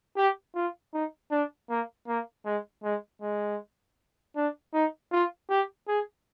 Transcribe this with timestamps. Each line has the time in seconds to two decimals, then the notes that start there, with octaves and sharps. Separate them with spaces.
0.17 G4
0.55 F4
0.93 D#4
1.31 D4
1.70 A#3
2.08 A#3
2.46 G#3
2.84 G#3
3.22 G#3
4.36 D4
4.74 D#4
5.12 F4
5.50 G4
5.88 G#4